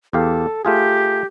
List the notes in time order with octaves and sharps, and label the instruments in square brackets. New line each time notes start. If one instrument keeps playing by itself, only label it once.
[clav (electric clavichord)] E2 G4 F5 [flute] A4
[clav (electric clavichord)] A3 F4 G#4 [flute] G4